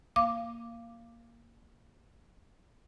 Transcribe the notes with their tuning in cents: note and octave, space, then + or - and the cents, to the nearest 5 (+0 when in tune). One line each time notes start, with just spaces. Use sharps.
A#3 +0 F5 -15 D6 +0